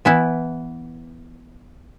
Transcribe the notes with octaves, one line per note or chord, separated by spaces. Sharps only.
E3 B3 E4